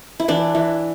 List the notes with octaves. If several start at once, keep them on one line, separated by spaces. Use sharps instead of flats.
E4
E3 D4
E3